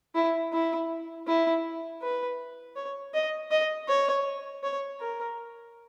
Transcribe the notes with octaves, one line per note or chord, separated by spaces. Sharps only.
E4
E4
E4
B4
C#5
D#5
D#5
C#5
C#5
A#4